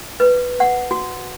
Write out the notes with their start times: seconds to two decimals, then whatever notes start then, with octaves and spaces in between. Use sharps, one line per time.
0.20 B4
0.60 F#5
0.91 F#4